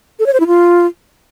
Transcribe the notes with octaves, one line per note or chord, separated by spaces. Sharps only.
A4
C#5
C5
E4
F4